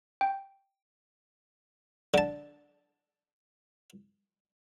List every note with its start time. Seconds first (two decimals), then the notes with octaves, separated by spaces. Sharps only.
0.21 G5
2.14 D3 A5